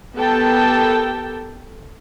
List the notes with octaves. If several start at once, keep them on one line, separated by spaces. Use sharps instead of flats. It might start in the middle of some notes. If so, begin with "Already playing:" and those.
B3 G4 A4 A#4 G5 A5